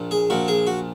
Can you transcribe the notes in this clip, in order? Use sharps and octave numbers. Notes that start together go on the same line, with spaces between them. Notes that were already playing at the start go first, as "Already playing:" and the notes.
Already playing: A#1 A#2
G#4
A#1 A#2 F#4
G#4
F#4